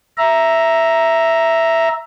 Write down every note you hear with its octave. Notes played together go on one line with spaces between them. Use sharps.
E5 A#5